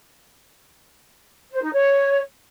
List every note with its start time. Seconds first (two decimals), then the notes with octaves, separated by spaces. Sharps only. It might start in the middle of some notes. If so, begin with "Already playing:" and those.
1.51 C5
1.62 D#4
1.73 C#5